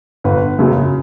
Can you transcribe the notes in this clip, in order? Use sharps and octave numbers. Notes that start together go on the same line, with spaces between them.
G1 B4
F#2 C#3 F#3